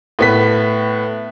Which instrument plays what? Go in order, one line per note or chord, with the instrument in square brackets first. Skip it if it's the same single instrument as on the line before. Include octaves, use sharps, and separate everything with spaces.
[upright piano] A2 B3 B6